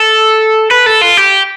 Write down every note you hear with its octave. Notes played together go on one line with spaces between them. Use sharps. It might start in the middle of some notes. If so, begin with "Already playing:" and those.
Already playing: A4
B4
A4
F4
G4